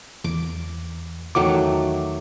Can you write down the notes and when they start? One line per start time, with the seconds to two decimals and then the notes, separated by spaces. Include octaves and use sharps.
0.24 E2 D6
1.35 E2 D#3 F#3 A3 D6